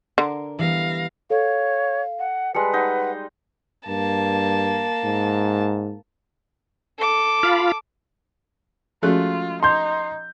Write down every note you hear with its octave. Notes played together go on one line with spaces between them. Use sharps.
D3 A#4
E3 G3 B3 F5 A#6
A4 C#5 F5
F#5
G3 G#3 B4 A5 C#7
D#4 F#5
G2 A#3 A5
G#2
A4 D6
F4 F5 B5
F3 G#3 A3 C#4 F4 F#4 F#6
D#4 C6 G6